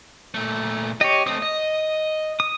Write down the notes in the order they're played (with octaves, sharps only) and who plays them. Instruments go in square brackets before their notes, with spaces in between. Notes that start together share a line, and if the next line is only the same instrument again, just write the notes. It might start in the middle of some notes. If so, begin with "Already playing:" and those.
[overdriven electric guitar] A#2 A3
[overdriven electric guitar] G4 [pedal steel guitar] C#5 D#5
[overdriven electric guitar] A3 C4 [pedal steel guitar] D#6
[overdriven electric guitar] D#5
[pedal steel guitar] D#6